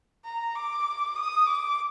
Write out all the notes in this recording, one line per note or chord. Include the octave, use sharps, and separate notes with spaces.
A#5
D6
D#6
D6